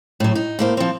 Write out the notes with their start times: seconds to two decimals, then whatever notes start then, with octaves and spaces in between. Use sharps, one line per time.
0.20 A2 F#3
0.35 D#4
0.59 A2 A#3 C5
0.77 F3 C4